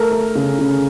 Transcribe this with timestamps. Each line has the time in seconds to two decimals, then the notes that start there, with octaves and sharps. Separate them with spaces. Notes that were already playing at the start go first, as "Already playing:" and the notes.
Already playing: A3 A#4
0.12 A3
0.35 C#3
0.59 C#3